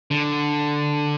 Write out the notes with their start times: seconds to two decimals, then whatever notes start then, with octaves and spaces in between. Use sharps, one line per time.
0.11 D3